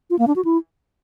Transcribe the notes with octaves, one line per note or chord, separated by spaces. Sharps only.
F4
A#3
D4
F#4
E4